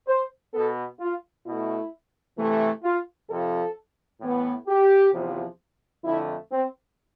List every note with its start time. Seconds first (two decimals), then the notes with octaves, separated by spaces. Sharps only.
0.08 C5
0.54 B2 B3 A4
1.00 F4
1.46 B2 A3 E4
2.38 C3 E3 A3
2.84 F4
3.29 F2 C3 F3 A4
4.21 A2 E3 B3
4.67 G4
5.13 E2 C3 F3
6.04 F2 D3 A3 E4
6.51 C4